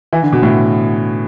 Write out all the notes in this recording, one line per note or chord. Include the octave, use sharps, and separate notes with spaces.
E3
D3
B2
A2